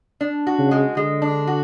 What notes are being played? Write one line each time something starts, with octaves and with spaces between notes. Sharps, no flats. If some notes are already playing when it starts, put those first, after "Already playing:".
D4
F#4
C#3
G#3
D3 G#3
D4
F#4